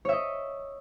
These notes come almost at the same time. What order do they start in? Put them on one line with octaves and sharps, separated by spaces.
C#5 E5 D#5